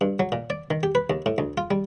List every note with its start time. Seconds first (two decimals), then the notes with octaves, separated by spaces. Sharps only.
0.01 G2
0.19 F#3
0.32 A#2
0.50 D5
0.70 D#3
0.83 G4
0.95 B4
1.10 D#2
1.26 A2
1.38 D2
1.58 F4
1.71 G3